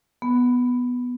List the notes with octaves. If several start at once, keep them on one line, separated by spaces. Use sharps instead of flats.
B3